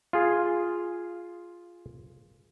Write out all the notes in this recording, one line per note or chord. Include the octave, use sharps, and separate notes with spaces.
F4 G#4